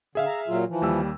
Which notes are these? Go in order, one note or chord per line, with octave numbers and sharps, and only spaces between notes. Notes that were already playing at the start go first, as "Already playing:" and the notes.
D3 G#4 E5 F5
A#5
A#2 F#3 F4
E3 F3
D#2 G3 E6